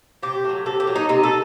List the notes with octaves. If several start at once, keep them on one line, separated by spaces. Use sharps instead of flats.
C3 G4
F#3 A3
C3 A4
G4
F#3 A3
D#4
C3 D#4
A4